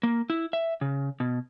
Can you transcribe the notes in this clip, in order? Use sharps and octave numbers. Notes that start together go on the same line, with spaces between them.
A#3
E4
E5
C#3
B2